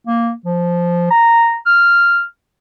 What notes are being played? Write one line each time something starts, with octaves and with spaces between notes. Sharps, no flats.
A#3
F3
A#5
F6